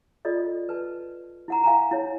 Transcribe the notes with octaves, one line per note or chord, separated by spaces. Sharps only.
F4 A4 D5 D#5
B4 A5
E4 F#5 A#5
F5 F#5 G#5 A#5
E4 C#5